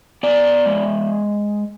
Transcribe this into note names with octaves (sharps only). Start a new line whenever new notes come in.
B3 D5
G#3